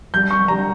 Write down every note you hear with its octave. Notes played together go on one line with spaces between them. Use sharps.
G3 G6
C#6
G3 A#5